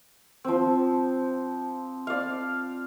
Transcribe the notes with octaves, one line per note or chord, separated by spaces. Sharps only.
F3 C4
D5 F5